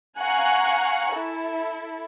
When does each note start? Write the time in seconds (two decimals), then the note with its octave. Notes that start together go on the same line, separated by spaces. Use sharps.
0.20 F5 F#5 G#5 A#5 C#6 F#6
1.14 E4 A4